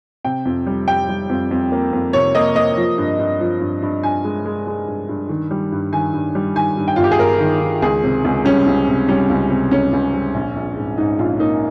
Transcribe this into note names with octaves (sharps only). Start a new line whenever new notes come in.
C3 G5
F2
G3
G3 G5
G3
F2
F2
A#3
F2
C3 C#5
A#3 D#5
A#3 D#5
F3
G2
G2
F3
G2
G2
G2 G#5
G#3
G#3
G#3
G2
G2
D#3
G3
G2
D#3 G#5
G2
G3
D#3 G#5
G2
G5
G1 F4
G4
G#4
G1 A#4
D#3
D#3
C#2 G#4
C3
C#2
G3 C#4
C#2
C3
G3 C#4
C#2
C3
C#2 C#4
C#2
G3
A#1
A#1
G#2
G#2 D#4
A#1 F4
A#3 D#4